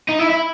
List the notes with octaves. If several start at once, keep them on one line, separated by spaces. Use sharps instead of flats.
D#4
E4
E4